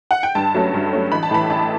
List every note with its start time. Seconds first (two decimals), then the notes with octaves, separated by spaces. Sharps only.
0.11 F#5
0.23 G5
0.35 G2 A5
0.54 F#3 A3 C#4
0.74 G2
0.93 F#3 A3 C#4
1.12 A1 B5
1.23 A5
1.31 A2 E3 B5
1.50 A1 A5